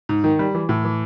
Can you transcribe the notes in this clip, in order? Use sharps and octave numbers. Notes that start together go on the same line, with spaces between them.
G#2
D#3
G3
E3
A2
E3